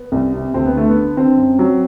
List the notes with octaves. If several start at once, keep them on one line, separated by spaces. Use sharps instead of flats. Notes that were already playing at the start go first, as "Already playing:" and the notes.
Already playing: B3
C2
C3
D2 C4
B3
D3 A3
B3
D3
D3 C4
F#2
F#3